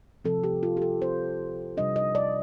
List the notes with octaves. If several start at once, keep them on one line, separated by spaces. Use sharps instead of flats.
C3 F3 C4 A4
G4
F4
G4
A4
C5
C3 G3 D4 D#5
D#5
D5